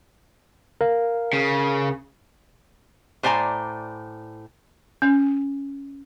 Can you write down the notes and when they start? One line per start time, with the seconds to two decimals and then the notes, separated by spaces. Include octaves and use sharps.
0.81 A#4 F5
1.33 C#3
3.23 A2 C5 D5 G#5 A#5
5.02 C#4